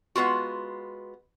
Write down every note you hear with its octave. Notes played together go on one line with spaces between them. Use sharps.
G#3 B3 F4 F#4